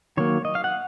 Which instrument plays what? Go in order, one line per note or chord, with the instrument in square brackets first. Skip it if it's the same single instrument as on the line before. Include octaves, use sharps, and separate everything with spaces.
[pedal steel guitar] D#3 F#3 A#3 C#5
D#5
F5
F#5